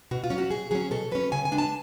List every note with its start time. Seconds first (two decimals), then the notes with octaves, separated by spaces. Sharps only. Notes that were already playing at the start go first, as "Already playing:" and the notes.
0.11 B2 F#4
0.24 F4
0.30 F#3 C#4
0.38 F#4
0.51 B2 G#4
0.71 F#3 C#4 G#4
0.91 B2 A4
1.11 F#3 C#4 B4
1.32 C#3 G#5
1.45 G#5
1.52 G#3 B3 D4
1.58 A5